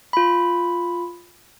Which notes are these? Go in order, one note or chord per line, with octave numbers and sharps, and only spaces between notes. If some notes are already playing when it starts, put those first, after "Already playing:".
F4 B5